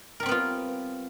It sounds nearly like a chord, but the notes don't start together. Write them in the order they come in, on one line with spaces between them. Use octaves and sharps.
A#4 G3 C4 B3 F4